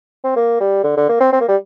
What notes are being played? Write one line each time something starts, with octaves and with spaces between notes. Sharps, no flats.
C4
A#3
G3
D3
D3
A#3
C4
C4
A#3
G3